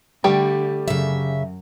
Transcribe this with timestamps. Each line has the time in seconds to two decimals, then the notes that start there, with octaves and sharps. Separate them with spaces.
0.24 D3 G3 A3 G4 G5
0.88 F#2 C#3 E5